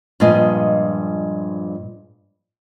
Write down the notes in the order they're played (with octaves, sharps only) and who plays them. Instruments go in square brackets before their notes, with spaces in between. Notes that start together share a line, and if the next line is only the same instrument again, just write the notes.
[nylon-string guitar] G2 A#2 F3 G#3 D#5 G#5